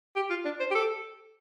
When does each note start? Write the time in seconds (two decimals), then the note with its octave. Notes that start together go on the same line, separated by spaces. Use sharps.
0.16 G4
0.30 F4
0.45 D4
0.60 C5
0.71 G4
0.75 A4